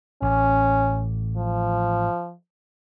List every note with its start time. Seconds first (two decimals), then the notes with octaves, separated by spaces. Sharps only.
0.22 A1 C#4
1.37 F3